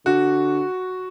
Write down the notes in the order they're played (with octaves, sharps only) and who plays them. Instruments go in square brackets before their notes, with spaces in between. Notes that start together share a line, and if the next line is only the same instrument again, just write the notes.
[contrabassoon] D3 [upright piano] F#4